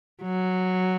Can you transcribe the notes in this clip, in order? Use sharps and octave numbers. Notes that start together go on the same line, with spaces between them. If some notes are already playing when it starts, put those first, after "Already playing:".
F#3